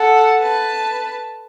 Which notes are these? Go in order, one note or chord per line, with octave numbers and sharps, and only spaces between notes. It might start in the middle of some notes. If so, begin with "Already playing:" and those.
Already playing: A4 F#5
B4 A5